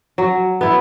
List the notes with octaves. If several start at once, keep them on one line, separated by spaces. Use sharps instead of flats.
F#3
B3 E4